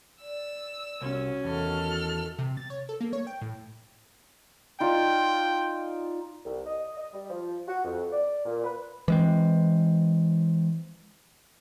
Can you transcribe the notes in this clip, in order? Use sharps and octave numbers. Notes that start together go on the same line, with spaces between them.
D5 E6
C2 C#4 F#4
E2 D#3 A4 F6
C3
A6
C#5
A4
A#3
C#5
G5
A2
D#4 F4 D5 G5
C2
D#5
D#5
G3
F3
F#4
F2
D5
A#2
B4
E3 G#3 C4